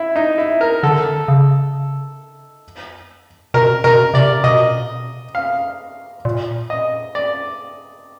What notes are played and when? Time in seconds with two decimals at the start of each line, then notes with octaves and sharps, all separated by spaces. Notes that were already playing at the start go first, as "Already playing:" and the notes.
Already playing: E4
0.16 D#4
0.38 E4
0.61 A#4
0.83 D3 A4
1.28 C#3
3.54 B2 A#4
3.84 B2 A#4
4.14 C3 D5
4.44 B2 D#5
4.57 A#2
4.69 B2
5.35 F5
6.25 A#2
6.70 D#5
7.15 D5